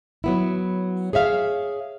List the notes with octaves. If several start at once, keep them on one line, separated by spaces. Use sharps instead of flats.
F#3 B3 E4
G#4 C#5 E5 F5